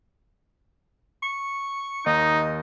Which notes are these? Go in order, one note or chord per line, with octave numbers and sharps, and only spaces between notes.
C#6
D#2 D#4 D#5